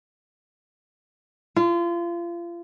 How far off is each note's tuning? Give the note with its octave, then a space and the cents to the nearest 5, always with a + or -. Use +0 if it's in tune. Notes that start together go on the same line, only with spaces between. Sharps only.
F4 -30